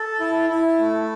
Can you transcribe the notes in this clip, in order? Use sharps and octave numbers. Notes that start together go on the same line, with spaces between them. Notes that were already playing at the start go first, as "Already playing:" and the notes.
Already playing: A4
E4
E4
A3